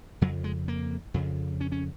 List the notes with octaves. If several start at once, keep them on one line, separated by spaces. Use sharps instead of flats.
F2 C#3 F#3
G#3
A#3
F2 C#3
C#4
C#4